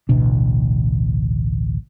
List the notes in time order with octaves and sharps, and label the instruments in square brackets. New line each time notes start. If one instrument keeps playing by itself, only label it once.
[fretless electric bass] A1 D2 B2 D4